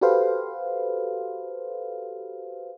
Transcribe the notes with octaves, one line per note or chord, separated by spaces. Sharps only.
F#4 G4 A4 B4 C5 F5